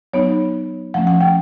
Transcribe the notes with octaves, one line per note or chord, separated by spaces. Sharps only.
F#3 B3 D#4 C#5
F3 A3 C#4 F#5
F#5
G5